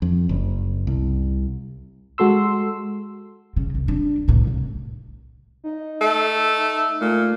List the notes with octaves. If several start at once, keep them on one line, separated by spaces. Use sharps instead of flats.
F2
F#1
C2
G#3 F#4 A4 C6 E6
C#3
C2
D4
C#2 A2
C2 D3
D#4
A3
A#2 A3